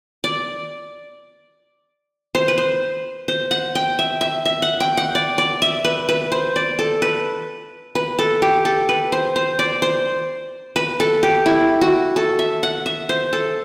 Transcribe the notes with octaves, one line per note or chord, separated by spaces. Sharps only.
D5
C5
B4
C5
C5
F#5
G5
E5
E5
E5
F#5
G5
F#5
D5
D5
E5
B4
B4
C5
D5
A4
B4
B4
A4
G4
A4
B4
C5
C5
D5
C5
B4
A4
G4
E4
F#4
A4
E5
F#5
E5
C5
A4